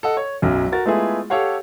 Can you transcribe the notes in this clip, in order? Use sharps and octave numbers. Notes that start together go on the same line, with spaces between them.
A4 D#5 F#5
C#5
B1 F#2
F#4 A#4 A6
G#3 A3 B3 E4 F4 G#4
G4 A4 C#5 F5 F#5